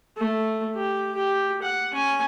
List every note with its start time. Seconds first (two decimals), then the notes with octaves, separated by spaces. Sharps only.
0.17 A3
0.75 G4
1.15 G4
1.62 F#5
1.93 C#4 G#5